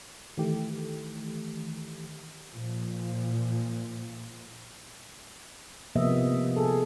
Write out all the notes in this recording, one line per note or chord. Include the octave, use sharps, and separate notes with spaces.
D#3 E3 A3 G4
A#2 F3
C3 F3 A#3 B3 D#5 E5
G#4 A4